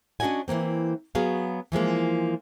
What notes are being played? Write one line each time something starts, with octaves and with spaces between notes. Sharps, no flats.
C#4 D4 F#4 D#5 F#5 G#5
E3 F3 A#3 C4
F#3 B3 F#4 G#4 F5
E3 F3 G#3 A#3